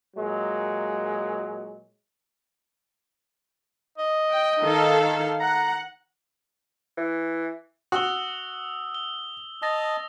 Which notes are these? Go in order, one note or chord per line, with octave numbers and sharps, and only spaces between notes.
A#2 F#3 G#3
D#5
G5
D#3 A4 F5
F#5 A#5
E3
F#4 D#6 E6 G7
G7
D#5 A5 D#6 A#6